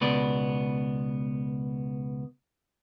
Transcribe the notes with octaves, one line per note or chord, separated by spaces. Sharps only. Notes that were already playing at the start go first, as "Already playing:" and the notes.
C#2 B2 B3 D5